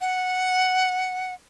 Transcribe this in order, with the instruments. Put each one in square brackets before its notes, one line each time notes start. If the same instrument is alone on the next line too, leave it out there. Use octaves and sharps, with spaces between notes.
[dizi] F#5